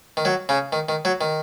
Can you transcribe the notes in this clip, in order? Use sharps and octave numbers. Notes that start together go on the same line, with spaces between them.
D#3
F#3
C#3
D#3
D#3
F#3
D#3